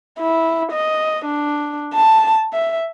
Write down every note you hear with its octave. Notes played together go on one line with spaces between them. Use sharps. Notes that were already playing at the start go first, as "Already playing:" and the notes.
E4
D#5
D4
A5
E5